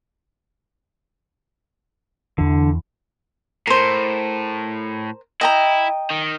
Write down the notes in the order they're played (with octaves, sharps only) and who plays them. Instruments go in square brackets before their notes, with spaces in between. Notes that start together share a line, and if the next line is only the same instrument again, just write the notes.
[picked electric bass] E2 E3 [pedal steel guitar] D3
[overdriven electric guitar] A2 [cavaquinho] A#4 C5
[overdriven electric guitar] E4 [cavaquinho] D#5 G5 A#5
[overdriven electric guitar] D#3